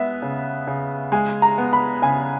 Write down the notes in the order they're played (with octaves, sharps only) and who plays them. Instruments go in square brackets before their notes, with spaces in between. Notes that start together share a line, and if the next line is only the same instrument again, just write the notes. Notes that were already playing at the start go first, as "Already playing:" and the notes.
Already playing: [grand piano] G#3 B3 [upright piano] E5
[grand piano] C#3
C#3
[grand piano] G#3 [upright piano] G#5
[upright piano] A#5
[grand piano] B3
[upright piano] B5
[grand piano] C#3 [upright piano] G#5